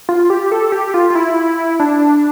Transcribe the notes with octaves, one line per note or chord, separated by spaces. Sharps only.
F4
G4
A4
G4
F4
F4
E4
D4